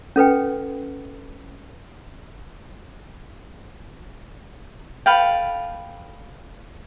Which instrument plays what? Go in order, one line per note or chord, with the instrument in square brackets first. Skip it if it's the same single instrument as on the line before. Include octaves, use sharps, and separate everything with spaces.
[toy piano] C#4 A4 B4 G5
[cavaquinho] A4 B4 F5 G5